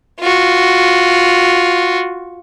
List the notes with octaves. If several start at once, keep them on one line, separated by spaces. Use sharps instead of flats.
F4 F#4